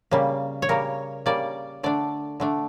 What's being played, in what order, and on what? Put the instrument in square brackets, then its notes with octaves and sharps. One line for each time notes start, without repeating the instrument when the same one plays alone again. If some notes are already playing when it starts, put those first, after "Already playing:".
[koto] C#3 G3 A#3
C#5
C#3 G3 A#3 A#4
C#3 G3 A#3 D5
D3 A3 D4 D5
D3 A3 D4